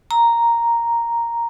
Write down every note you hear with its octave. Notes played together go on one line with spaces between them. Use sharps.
A#5